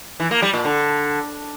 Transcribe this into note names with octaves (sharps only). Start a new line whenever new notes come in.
E3
A#3
G3
A#2
D3